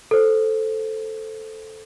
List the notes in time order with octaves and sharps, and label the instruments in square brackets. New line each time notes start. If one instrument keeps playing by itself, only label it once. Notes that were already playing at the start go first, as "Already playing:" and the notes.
[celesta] A4 C5